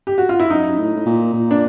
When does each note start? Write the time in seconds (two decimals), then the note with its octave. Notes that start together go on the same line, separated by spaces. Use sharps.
0.07 G4
0.18 F#4
0.29 F4
0.40 E4
0.50 F#2 D#4
0.78 A2
0.96 A2
1.06 A#2
1.33 A#2
1.51 D4